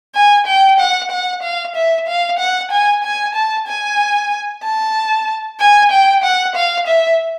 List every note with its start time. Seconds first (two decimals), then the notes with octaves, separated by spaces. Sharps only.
0.15 G#5
0.47 G5
0.80 F#5
1.11 F#5
1.43 F5
1.76 E5
2.07 F5
2.39 F#5
2.71 G#5
3.04 G#5
3.35 A5
3.67 G#5
4.63 A5
5.60 G#5
5.91 G5
6.24 F#5
6.56 F5
6.87 E5